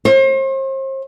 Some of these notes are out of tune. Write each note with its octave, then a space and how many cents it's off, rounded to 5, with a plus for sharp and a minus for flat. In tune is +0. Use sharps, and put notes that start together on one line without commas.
C5 +40